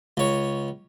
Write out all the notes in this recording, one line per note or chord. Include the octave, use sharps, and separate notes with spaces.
C#2 C#5